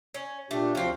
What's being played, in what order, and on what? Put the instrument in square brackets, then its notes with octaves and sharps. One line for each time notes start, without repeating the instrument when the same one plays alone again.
[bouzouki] C#4
[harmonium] A#2 D4 G4 [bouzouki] A3
[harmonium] D2 F3 F5 [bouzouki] F#3 C4